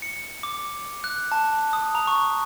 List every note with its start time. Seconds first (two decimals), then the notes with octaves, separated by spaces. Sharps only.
0.02 C#7
0.43 D6
1.04 F#6
1.32 A5
1.73 D#6
1.95 A#5
2.07 C#6